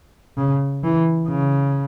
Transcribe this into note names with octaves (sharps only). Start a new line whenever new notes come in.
C#3
E3
C#3